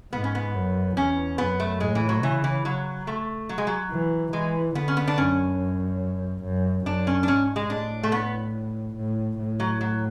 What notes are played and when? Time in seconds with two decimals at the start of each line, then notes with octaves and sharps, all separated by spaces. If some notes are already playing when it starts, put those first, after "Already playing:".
0.12 G#2 B3
0.24 C#4
0.35 B3
0.54 F#2
0.97 E2 C#4
1.38 F#2 B3
1.60 A3
1.80 A2 G#3
1.95 E3
2.09 F#3
2.23 C#3 E3
2.44 E3
2.65 F#3
3.07 A3
3.49 F#3
3.58 G#3
3.67 F#3
3.91 E3
4.33 E3 G#3
4.75 D3 B3
4.88 C#4
4.97 B3
5.08 D4
5.18 F#2 C#4
6.43 F#2
6.86 F#2 D4
7.07 C#4
7.23 D4
7.27 G#2 C#4
7.56 G#3
7.70 A2 D4
8.03 A3
8.12 B3
8.96 A2
9.38 A2
9.60 F#3
9.81 F#3